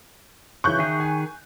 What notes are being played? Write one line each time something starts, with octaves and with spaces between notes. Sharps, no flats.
C#3 E3 C#6 F#6 G6
D#3 G#4 E5
G#5